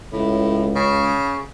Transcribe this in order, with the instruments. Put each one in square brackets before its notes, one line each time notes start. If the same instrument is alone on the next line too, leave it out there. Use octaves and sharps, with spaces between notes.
[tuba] C#2 [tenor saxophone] A2
[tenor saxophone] C#3